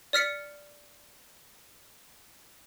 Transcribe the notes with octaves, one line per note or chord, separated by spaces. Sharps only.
D5 F6 B6 C#7